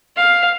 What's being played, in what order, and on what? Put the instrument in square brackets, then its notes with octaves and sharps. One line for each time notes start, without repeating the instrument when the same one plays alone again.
[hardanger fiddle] F5